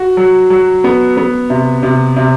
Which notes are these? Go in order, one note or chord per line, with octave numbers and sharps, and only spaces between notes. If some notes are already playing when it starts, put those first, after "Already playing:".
Already playing: F#4
F#3
F#3
B3
B3
C3
C3
C3